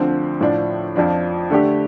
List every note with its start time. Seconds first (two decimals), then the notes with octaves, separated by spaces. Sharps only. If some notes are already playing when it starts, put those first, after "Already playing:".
Already playing: D2 D3 F3 C4
0.41 A2 F3 D4
0.96 F2 F3 D4
1.50 D3 A3 D4 G4